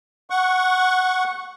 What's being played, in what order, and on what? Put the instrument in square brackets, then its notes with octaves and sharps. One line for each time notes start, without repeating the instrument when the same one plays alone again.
[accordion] F#5 C#6